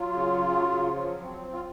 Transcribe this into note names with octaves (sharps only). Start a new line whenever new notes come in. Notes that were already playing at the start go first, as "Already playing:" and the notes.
Already playing: F#3 F4
C#3
F#3
F3
C4
F4